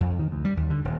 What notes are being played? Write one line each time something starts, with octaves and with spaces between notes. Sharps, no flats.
F2
D#3
D2
G3
D#2
D3
D#1